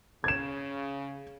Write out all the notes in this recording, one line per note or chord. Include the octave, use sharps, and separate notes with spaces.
C#3 G#6 E7